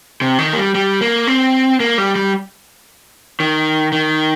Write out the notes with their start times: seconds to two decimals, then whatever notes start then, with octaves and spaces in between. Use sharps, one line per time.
0.21 C3
0.39 D#3
0.53 A#3
0.57 G3
0.75 G3
1.01 A#3
1.27 C4
1.80 A#3
1.98 G3
2.15 G3
3.40 D#3
3.92 D#3